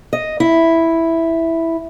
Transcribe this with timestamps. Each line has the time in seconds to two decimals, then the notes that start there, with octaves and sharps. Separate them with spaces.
0.13 D#5
0.40 E4